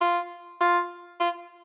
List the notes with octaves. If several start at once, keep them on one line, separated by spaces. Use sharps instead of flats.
F4
F4
F4